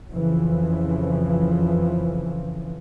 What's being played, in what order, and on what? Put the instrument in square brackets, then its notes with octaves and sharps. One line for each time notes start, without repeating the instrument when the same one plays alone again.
[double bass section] F2 C#3 E3 F3